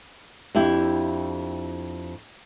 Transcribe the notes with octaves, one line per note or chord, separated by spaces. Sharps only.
F2 D4 E4 G4